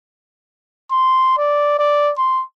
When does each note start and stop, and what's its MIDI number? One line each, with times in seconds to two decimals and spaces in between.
0.92 1.34 84
1.38 1.78 74
1.79 2.12 74
2.18 2.43 84